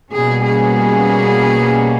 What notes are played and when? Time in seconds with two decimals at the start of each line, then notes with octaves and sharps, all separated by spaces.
0.12 B2 G3 A#3 C#4 G#4
0.46 G#4